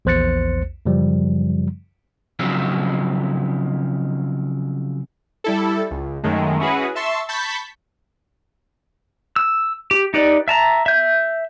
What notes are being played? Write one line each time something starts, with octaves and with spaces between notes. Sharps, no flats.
A#1 E2 C5 F#6 A6 C#7
F#2 C#3 F3 G3
C#3 F3 F#3 G#3 C4 C#4
G3 E4 A4
C#2
F#2 D#3 G#3 A3
C#4 E4 F#4 G#4 B4
E5 A5 C6 C#6 E6
A5 B5 C#6 G6 B6
E6
G4
D#4 G4 B4 D5
E5 A5 A#5
E5 G6